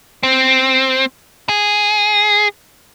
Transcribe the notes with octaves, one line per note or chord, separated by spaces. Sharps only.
C4
G#4